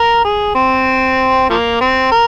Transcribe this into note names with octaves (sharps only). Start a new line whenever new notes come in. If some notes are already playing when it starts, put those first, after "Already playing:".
Already playing: A#4
G#4
C4
F3 A#3
C4
A#4